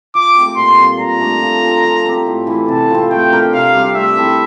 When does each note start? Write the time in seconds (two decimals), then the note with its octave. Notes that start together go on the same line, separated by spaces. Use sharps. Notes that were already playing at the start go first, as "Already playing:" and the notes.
0.15 F3 D6
0.35 A3 C4 G4
0.57 A#2 C6
0.78 G3 C4 F4
0.99 A#2 A#5
1.20 A3 D4
1.42 F3
1.63 C4 F4
1.85 F3
2.05 C4 G4
2.26 A2
2.47 E3 A3 E4
2.68 C3 A5
2.90 F3 C4
3.11 A3 G5
3.33 D4 G4 A#4
3.53 C3 F5
3.74 G3 C4 G4
3.95 A3 E5
4.17 C4 E4 A4